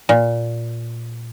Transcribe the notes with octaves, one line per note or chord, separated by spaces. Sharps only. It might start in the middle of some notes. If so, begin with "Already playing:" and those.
A#2